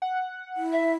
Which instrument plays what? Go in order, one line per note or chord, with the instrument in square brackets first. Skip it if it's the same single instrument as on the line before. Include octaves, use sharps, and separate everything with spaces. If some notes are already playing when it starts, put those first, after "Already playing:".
[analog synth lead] F#5
[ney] E4
[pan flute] E5